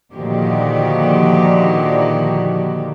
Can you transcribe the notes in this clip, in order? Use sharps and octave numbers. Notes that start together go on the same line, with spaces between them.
A#2 D3 D#3 F3 F#4 G4